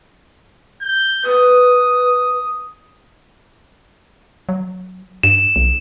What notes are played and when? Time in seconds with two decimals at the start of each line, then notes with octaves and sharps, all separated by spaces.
0.81 G6
1.25 B4 D#6
4.49 F#3
5.23 G2 E7
5.56 B1